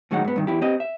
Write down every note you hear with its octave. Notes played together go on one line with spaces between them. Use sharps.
A2 D#3 F#3 G#3 D#4 F#5
G#2 B3
G2 D#3
E2 E4 G4
C4 G4 D#5
E5